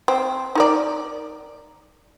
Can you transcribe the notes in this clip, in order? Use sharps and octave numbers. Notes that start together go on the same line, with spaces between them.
C4
D#4 A#4 D5